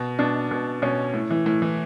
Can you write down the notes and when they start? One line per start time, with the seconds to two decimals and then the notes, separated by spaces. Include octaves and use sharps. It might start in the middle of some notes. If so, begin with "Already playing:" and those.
Already playing: B2
0.19 B2 D4
0.51 B2
0.82 B2 C#4
1.14 A2
1.30 E3
1.46 A2
1.62 E3